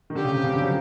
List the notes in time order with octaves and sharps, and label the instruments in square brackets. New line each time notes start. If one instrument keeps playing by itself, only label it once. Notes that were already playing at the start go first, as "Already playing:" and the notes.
[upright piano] D#3
[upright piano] D3 [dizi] G4
[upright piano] C#3
C3
C#3
D3
F#3
F3